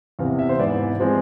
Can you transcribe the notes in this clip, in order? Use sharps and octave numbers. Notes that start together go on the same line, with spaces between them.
E2 C3 E3 F5
E5
C5
G#2 E3 B3 D5
F3 G#3 C4